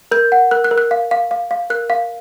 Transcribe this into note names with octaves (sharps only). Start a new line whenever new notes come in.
A#4 G6
F#5
A#4 F#6
F#6
A#4
F#6
F5
F5
F5
F5
A#4 F#6
F5